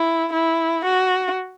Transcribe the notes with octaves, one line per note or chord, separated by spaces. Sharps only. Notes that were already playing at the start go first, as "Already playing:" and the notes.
Already playing: E4
E4
F#4